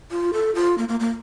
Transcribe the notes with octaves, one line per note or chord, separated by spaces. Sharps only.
F4
A4
F4
A#3
A#3
A#3